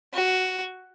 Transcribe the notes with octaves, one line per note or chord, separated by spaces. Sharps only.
F#4